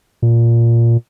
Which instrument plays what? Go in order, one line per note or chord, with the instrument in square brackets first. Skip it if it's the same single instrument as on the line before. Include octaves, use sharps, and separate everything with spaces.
[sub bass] A#2